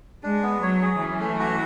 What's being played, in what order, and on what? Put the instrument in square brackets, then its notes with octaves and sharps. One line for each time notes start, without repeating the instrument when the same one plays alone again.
[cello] G#3 [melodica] D4
[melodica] B3
[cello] F#3 [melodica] C#5
[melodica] G#4
[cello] E3 [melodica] C#4
[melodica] A3
F#4